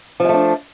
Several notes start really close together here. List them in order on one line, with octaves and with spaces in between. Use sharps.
F3 G#3 A3 D4